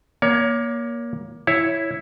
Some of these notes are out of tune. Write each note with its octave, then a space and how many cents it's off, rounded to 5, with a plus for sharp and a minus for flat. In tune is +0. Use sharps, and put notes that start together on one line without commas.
A#3 +20 C#5 +30
E4 +0 C#5 +0